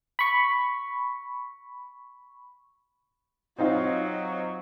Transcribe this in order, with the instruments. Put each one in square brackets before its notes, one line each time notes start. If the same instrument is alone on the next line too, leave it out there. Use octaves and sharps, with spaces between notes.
[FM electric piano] B5 C#6
[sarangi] F#3 [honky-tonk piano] C4 D#4 F4